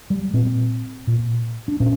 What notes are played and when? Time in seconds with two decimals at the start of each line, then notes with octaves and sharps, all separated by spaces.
0.10 G3
0.33 A#2 C4
1.07 A#2
1.68 D4
1.80 A#2 C#4